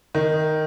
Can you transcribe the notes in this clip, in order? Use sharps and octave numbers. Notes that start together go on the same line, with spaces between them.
D#3